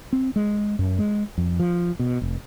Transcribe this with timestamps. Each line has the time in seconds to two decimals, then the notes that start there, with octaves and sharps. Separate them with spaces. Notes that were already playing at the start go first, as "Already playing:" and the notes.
0.13 C4
0.36 G#3
0.79 F#2
0.99 G#3
1.38 F2
1.60 F3
1.99 B2
2.22 F1